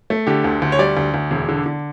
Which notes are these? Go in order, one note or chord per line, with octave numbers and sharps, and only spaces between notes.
A3
D3 G4
D2
D2
C#5
G3 D5
D2
D2
E1
D3
D3